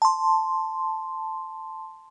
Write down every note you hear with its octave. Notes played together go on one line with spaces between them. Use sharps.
A5 C6